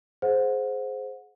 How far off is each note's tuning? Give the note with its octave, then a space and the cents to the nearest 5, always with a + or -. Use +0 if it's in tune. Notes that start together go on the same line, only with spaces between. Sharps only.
G#4 +20 C5 +0 F#5 -30